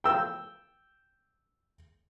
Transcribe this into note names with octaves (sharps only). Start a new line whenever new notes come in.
G5 E6